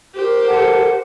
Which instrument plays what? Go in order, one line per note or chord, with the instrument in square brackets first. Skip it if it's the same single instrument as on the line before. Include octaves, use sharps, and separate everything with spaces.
[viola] G4 C5 [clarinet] A#4
[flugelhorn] A4 [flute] F#5